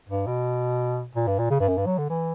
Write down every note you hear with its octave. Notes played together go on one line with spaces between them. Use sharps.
G2
B2
A#2
G2
A#2
C#3
G2
F#2
G2
F#3
D3
E3